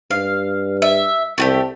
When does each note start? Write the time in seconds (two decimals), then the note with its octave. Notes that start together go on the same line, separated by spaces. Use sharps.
0.11 G2 F5
0.82 E5
1.38 C2 A3 F#4 G4